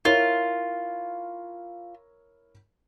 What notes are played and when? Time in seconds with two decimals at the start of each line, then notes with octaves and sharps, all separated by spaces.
0.05 E4 F4 A#4 C#5